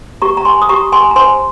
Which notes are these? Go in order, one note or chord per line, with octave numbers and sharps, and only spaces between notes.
G4 A#5 C#6
A#5
G#5 C6
D#6
G4 A#5 C#6
G#5 C6
A#5
C5 G#5 C6